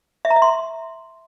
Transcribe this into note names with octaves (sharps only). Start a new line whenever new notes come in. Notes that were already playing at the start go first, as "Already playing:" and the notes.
E5
A#5
E5
C6